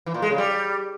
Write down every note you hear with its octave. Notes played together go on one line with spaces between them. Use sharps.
E3
A#2
G#3
C#3
G3